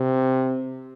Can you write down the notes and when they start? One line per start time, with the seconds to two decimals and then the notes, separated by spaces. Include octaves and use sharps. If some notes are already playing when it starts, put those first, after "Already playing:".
Already playing: C3